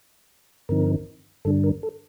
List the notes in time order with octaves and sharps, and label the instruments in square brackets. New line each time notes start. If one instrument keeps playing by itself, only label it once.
[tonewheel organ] G2 D3 F3 C4 D#4 A#4
G2 D3 G3 D4 A4
A#4
A4